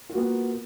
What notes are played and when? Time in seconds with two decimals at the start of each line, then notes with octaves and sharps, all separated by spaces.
0.09 F4
0.12 F#4
0.15 A#3
0.18 B3
0.21 A#4